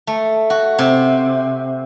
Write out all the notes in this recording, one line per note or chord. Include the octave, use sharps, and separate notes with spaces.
A3
F#4
C3